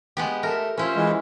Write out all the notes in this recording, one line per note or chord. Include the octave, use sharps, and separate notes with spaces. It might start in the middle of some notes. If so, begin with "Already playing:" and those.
G#3 B3 G4
A4 A#4 E5
C#4 E4 F4 C5
E3 G#3